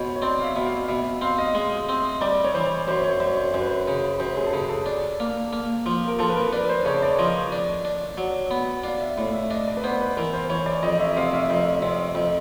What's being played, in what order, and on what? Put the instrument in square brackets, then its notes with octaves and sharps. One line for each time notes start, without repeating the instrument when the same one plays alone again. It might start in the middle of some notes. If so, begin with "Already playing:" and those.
Already playing: [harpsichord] B2 [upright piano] C5 C#5
[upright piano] C#5
[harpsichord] C4 [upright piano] D5
[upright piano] F5
E5
[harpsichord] B2
[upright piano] F5
[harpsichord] B2 [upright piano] E5
[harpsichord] C4 [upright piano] F5
[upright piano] D#5
[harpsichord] G#3
C4
[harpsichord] G3 [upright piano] D5
[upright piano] C#5
[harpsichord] E3 [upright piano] C5
[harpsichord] F#2 [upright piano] C5
[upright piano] C#5
[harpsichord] F#2 [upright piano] C5
[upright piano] C#5
[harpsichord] F#2 [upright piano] C5
[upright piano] B4
C5
[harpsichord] C#3
[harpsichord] F#2 [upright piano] C5
[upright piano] G#4
A4
[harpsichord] C#3 [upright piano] G#4
[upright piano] A4
[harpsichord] D4
A#3
A#3
F3
[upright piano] A#4
[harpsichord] F3 [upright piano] A4
[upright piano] B4
A#4
[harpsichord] D4 [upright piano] B4
[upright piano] C5
[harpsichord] C#3 [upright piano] C#5
[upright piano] D5
[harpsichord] F3 [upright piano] D#5
[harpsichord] D4
D4
F#3
B3
[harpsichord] D4 [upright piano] F5
[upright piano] E5
[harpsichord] A2
[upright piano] E5
[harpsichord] D4 [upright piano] D#5
[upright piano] D5
B4
[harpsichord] B3 [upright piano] C5
[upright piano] B4
[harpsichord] E3 [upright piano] A#4
[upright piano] C5
[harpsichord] E3 [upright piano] C#5
[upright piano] D5
[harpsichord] F2 [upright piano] D#5
[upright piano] E5
[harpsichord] C3 [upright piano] F5
[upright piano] E5
[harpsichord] F2
C3
F2